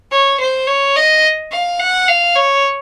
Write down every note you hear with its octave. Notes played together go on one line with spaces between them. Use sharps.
C#5
C5
C#5
D#5
F5
F#5
F5
C#5